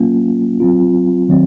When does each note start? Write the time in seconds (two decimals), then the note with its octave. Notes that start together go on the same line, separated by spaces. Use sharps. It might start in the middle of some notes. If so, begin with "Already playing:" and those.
Already playing: F#3 A#3 C#4 F4
0.60 F#3 C4 F4
1.29 D#3 F#3 C4